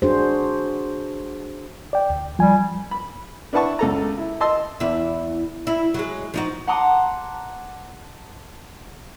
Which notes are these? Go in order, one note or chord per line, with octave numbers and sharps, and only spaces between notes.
D4 F#4 G#4 C5
D5 G5
D2
F3 G3 G#5
B5
D4 E4 B4 F#5 A5 C#6
C#2 A4 A#5
E4
D#5 A5 C6 E6
E2 E4
E4
F#3 G#3
F3 D#4 F#4
F#5 A5 A#5 C6 D6 D#6